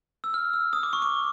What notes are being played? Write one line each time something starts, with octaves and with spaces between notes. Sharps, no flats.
E6
F6
E6
D#6
D6
C#6
D6